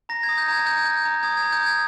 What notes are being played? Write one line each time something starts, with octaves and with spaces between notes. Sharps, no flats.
A#5 A#6
G#6
D#6
G6
A#5 G#6
G6
G6
A#5
D#6 G#6
G#6
A#5
G6
D#6 G#6